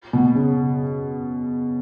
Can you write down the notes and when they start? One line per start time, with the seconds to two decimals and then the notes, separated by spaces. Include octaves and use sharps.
0.13 B2
0.35 C#3